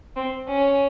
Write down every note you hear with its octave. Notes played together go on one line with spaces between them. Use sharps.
C4
C#4